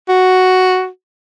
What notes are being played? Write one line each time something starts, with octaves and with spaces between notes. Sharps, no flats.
F#4